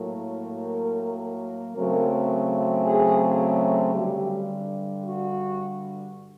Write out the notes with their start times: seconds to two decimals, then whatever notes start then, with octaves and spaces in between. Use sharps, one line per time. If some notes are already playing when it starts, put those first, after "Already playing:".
Already playing: A2 F#3 A#3
0.66 A#4
1.75 C#3 F#3 A3 C4 A#4
2.84 G#4
3.93 G2 D3 G3 G4
5.04 F#4